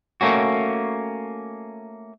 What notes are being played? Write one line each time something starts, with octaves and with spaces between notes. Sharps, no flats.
A3 A#3 C#4 F#4